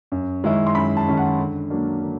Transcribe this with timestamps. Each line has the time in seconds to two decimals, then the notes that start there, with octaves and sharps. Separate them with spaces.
0.12 F#2
0.44 D#3 G#3 C#4 E4
0.67 C6
0.75 F#2 B5
0.97 A5
1.07 D#3 G#3 C#4 E4
1.17 F#5
1.39 D3
1.70 F#3 A#3 D4
2.02 D3